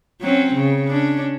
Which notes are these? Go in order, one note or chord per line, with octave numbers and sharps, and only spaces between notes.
F#3 C4 C#4
C#3
C#4 D4